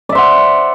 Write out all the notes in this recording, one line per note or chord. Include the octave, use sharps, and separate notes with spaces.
C5 D5 E5 F#5